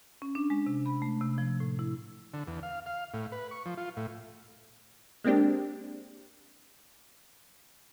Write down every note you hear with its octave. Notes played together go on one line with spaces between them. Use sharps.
C#4
D4
G#3
C3
B5
A3
C3
F3
A2
E4
D3
E2
F5
F5
A2
B4
C#6
F3
F4
A2
G#3 A#3 C4 D4 G4